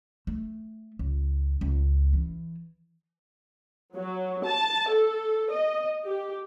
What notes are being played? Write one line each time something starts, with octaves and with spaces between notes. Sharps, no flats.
A3
C#2
C#2
E3
F#3
A5
A4
D#5
G4